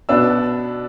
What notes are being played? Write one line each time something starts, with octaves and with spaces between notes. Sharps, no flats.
B2 B3 D4 E6